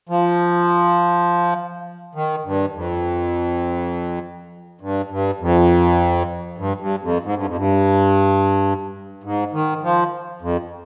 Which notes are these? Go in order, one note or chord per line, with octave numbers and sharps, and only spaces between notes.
F3
D#3
G2
F2
G2
G2
F2
G2
G2
F2
G#2
G2
F2
G2
G#2
D#3
F3
F2